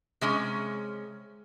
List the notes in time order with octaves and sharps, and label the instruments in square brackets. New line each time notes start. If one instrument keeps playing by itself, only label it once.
[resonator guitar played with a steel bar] C3 G#3 C#4